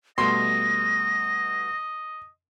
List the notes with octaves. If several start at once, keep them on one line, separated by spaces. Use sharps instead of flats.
B2 G3 A3 D#5 C6 A#6